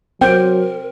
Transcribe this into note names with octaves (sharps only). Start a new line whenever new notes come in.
F#3 C4 A#4 G5